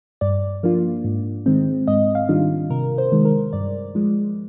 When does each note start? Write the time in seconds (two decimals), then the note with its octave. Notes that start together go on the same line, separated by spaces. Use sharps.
0.21 G2 D5
0.63 F3 A#3 D4 F4
1.04 G#2
1.46 D#3 G#3 C4
1.88 G#2 D#5
2.15 F5
2.29 D#3 G3 D4 F4
2.70 C3 A#4
2.98 C5
3.12 D#3 G#3
3.25 A#4
3.53 G2 D5
3.95 F3 G#3